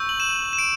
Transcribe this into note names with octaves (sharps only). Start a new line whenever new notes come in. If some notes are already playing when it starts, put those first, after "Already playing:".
Already playing: C#6 E6 G6
F#7
E7
E7
D7